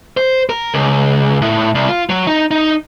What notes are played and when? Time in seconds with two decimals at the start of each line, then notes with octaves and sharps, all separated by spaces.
0.17 C5
0.49 A#4
0.74 C#2
1.42 A2
1.75 C2
1.89 F4
2.09 F#3
2.27 D#4
2.51 D#4